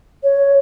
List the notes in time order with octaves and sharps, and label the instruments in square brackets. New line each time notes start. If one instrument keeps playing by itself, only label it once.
[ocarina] C#5